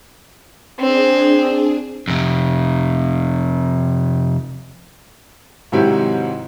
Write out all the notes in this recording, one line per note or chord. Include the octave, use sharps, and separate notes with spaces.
C4 D4 G#4
F2 C3
G#2 C3 D#3 F#3 E4 G4